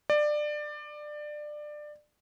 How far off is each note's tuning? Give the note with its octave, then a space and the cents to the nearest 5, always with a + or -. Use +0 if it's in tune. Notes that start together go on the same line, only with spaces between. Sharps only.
D5 +20